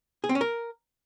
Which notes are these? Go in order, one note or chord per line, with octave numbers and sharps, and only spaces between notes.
G#4
C4
C#4
A#4